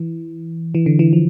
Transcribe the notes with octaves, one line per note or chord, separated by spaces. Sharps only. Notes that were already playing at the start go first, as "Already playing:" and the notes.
Already playing: E3
E3
D3
E3
F3